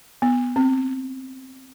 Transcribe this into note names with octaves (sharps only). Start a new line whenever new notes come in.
B3
C4